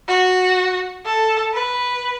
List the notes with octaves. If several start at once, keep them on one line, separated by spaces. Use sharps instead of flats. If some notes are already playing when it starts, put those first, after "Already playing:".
F#4
A4
B4